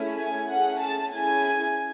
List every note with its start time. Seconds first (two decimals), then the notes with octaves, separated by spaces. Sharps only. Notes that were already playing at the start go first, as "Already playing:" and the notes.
Already playing: A3 C#4 E4 G#4
0.17 G#5
0.48 A3 C#4 G#4 F#5
0.81 A5
1.13 C#4 E4 G#4 G#5